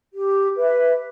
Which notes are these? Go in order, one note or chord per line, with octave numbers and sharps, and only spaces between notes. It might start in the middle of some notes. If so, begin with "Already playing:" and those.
G4
B4 E5